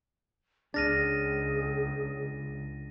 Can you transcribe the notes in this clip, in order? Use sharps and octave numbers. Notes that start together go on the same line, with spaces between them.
C#2 D4 G#4 F6 A6 A#6 D#7